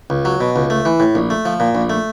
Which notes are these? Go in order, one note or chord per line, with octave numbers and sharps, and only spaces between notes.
C#2
F#3
B2
C#2
A3
E3
A2
A#1
A3
F3
A#2
A#1
A3